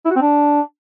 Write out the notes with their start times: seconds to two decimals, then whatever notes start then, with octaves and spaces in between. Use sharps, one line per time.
0.05 E4
0.10 F#4
0.16 C4
0.21 D4